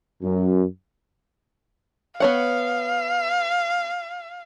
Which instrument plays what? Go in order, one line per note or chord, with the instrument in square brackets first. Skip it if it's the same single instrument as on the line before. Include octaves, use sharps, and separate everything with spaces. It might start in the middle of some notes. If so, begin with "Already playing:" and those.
[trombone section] F#2
[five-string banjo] B3 C#5 F#5 [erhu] F5